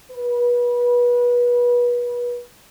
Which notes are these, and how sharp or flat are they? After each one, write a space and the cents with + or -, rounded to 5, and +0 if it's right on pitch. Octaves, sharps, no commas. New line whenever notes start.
B4 -30